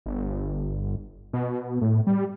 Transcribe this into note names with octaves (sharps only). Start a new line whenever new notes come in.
G1
B2
A2
G3